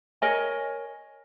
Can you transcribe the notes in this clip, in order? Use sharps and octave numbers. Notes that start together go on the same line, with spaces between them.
A#4 C#5 D#5 G#5